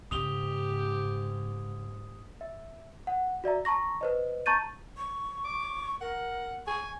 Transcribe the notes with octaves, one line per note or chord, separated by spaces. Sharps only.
G#2 C#3 G4 D#6 F7 G7
E5
F#5
F#4 D5 E5 A#5
A5 A#5 C#6 A#6
B4 C5 D#5
A5 A#5 C#6 G6 A6 D#7
C#6
D6
A#4 F#5
G#5 C#6